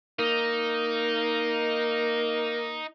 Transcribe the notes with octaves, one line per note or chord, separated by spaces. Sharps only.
A#3 D#4